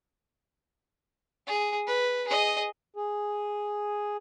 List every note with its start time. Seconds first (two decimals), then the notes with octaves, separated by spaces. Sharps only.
1.47 G#4
1.87 B4
2.28 G#4 D#5
2.96 G#4